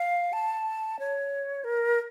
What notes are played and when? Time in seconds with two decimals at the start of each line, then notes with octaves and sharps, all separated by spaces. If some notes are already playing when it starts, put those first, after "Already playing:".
Already playing: F5
0.33 A5
0.99 C#5
1.64 A#4